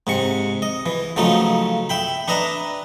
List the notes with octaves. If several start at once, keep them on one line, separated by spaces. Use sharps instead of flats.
G#2 C3 C#6
D#5
E3
C#3 F3 F#3 A3 D#4
E5 G5 B5
D4 B4 D#5 E5 A#5